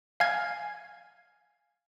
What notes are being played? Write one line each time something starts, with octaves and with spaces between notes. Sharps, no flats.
F5 G#5 F6 G#6